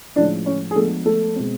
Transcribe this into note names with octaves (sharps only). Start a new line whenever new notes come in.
A2 F3 G#3 C#4 D4 D5
C#4 C#5
G#4
F3 G#3 A3 B3 D4 A4
A3 A4
B2 G#3 C4